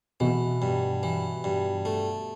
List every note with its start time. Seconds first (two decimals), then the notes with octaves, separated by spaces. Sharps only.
0.20 B2 E3
0.62 G2
1.03 E3
1.44 G2
1.85 A3